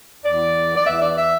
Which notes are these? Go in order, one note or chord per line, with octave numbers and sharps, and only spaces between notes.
E2 E3 B3 D5
D5
E2 E3 B3 E5
D5
E5